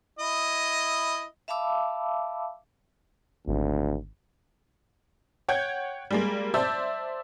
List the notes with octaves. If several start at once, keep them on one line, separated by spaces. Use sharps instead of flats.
E4 D#5
E5 F5 A5 B5 D6 E6
G#1 D2
C#5 F#5 G5 G6 G#6
G3 G#3 A#3
C5 D5 E5 A5 E6 G6